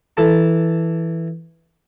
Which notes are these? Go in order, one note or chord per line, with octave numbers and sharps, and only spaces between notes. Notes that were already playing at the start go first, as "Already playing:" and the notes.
E3 A4 A5